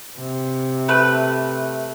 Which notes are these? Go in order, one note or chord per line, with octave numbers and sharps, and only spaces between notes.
C3
A3 B4